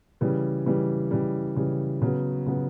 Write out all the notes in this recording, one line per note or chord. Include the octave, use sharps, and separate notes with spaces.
C#3 E3 G3
C#3 E3 G3
C#3 E3 G3
C#3 E3 G3
C#3 F#3 B3
C#3 F#3 B3